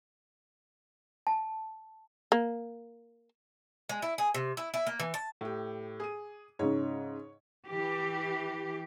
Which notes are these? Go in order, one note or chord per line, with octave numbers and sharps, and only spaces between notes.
A5
A#3
G#3
E4
G#4
C3
E4
E4
A#3
E3
A5
A2 G4
G#4 D#7
G#2 C#3 C#5
E3 G4